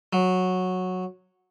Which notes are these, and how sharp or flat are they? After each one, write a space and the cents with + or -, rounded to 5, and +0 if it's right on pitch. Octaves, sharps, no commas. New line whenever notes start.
F#3 -10